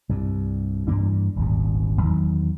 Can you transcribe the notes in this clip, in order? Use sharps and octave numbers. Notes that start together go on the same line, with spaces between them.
C2 G2
G2 E3 A#3 D4
D#1 G#1 D2
E2 D#3 F#3